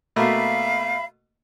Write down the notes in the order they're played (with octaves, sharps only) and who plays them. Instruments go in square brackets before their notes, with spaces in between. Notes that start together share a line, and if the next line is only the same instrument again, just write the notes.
[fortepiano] B2 A3 A#3 [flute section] E5 F5 B5